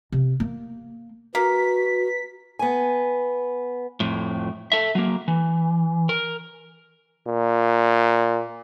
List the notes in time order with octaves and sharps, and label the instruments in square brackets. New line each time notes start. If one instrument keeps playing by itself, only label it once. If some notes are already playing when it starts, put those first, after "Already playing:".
[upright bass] C3
A#3
[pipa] A#3 [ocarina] F#4 [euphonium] B4 [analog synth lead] B6
[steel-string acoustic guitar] B3 G#5
[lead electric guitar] F2 A2
A4 E5
F#3 A#3
E3
A#4
[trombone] A#2